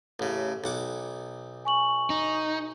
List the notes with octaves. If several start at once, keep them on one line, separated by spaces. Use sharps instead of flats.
A1 C#3
B1 F#5 D6
G#5 C#6 F#7
D#4